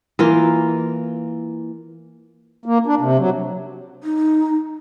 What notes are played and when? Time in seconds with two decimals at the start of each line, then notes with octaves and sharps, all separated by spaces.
0.19 E3 A#3 F4
2.66 A#3
2.86 D4
3.01 C3
3.18 F#3
4.04 D#4